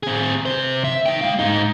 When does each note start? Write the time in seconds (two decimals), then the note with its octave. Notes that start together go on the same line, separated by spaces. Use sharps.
0.03 C4 G#4
0.46 C3 C5
0.84 E5
1.06 D#4 G5
1.21 G#3 F5
1.39 G#2 D#4